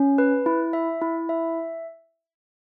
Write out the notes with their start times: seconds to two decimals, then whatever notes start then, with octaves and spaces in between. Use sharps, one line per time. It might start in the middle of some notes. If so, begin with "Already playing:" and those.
Already playing: C#4
0.18 B4
0.46 E4
0.73 E5
1.02 E4
1.29 E5